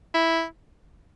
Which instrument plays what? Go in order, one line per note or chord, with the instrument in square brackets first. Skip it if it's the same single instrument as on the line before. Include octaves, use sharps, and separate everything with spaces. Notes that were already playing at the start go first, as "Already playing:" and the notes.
[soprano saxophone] E4